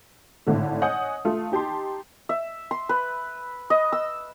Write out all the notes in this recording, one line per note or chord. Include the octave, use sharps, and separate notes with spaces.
G#1 A2 D3 A3
C#5 D#5 F#5 G#5 D#6 G6
A3 F4 F5
D#4 G4 A5 C6
E5
C6
B4
D#5
E6